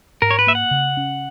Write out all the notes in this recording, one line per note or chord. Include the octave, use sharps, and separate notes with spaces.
G#2 A#4
C#5
B4
A#3 E5
F#5
C#3
C#4